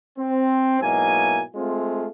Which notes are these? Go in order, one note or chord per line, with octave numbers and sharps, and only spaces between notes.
C4
G#2 B2 F#3 A#3 E4 G#5
G#3 A3 C4 F4